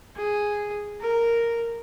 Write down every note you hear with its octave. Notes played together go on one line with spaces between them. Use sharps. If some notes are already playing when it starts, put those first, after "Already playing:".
G#4
A#4